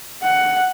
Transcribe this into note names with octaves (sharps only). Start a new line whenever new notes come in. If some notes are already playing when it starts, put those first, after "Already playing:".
F#5